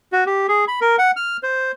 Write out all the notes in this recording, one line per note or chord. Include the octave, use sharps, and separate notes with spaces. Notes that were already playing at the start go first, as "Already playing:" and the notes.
F#4
G4
G#4
B5
A#4
F#5
F6
C5